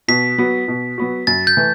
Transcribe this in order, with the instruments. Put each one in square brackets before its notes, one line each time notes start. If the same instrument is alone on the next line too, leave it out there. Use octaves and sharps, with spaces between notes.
[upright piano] B2 [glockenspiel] B6
[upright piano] F#3 B3 F#4
B2
F#3 B3 F#4
[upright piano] F#2 [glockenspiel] A6
[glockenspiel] G6
[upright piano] E3 A3